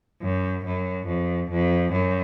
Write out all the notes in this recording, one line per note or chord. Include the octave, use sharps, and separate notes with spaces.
F#2
F#2
F2
F2
F#2